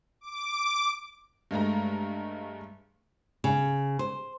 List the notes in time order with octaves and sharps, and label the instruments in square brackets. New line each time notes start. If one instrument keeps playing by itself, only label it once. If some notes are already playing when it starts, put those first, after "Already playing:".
[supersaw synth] D6
[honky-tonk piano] G2 G#3 A3 A#5
[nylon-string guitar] C#3
C5